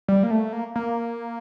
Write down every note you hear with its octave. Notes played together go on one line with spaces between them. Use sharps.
G3
A#3
A3
A#3
A#3